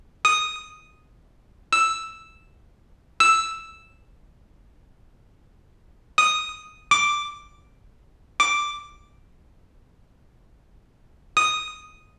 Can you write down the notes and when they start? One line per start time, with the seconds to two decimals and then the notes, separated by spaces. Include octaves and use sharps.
0.25 D#6
1.73 E6
3.20 E6
6.18 D#6
6.91 D6
8.40 D6
11.37 D#6